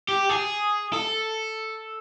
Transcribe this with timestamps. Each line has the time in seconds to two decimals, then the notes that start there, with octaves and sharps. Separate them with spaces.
0.08 G4
0.30 G#4
0.93 A4